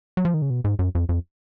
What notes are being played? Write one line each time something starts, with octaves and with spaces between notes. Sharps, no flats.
F#3
F3
D#3
C#3
B2
G#2
F#2
F2
F2